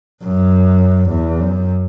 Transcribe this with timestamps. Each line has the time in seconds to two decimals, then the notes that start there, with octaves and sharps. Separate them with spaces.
0.24 F#2
1.10 E2
1.40 F#2